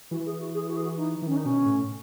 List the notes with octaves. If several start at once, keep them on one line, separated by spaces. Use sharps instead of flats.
E3 F#4
G#4
F#4
G#4
F#4
G#4
F#4
D#4
E3
D#3 C#4
D#4
B2 C#4
A2